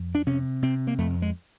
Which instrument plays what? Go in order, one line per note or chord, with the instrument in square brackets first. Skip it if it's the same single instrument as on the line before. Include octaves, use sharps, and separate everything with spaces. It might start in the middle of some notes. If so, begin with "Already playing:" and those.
Already playing: [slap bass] F2
D4
C3 C#4
C3 C4
A#3
F2 A3
G#3